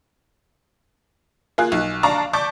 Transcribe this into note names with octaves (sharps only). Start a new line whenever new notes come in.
A#3 F4 G#4 F#6
B1
D4 D5 F5 A5 A#5 C#6
D5 A5 C#6 D6 G6 B6